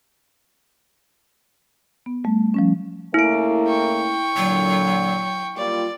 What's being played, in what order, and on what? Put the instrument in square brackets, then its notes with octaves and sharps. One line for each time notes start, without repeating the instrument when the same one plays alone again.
[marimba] B3
G3 A3
F3 G3 C#4
[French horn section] C#3 A3 A#3 [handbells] E4 D7
[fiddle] G5 C#6
[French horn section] A#2 D3 [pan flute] F#3
[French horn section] G3 A#3 F4 [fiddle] D5